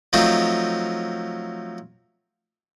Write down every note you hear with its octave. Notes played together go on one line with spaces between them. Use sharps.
F3 F#3 A3 C4 D#4 F4